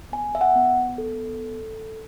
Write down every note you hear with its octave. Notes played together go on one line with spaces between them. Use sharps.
B3 G#5
E5
F#5
B3
A4